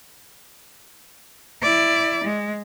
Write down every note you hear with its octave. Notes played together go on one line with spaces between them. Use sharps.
E4 D5
G#3